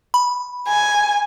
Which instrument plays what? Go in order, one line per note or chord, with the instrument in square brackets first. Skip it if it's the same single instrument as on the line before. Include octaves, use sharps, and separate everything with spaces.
[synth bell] B5
[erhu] G#5